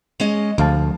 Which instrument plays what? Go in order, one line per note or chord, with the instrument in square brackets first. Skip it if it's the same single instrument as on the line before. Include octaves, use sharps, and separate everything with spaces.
[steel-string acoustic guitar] G#3 C#4 D#5
[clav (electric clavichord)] D2 F5 A5 [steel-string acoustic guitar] F3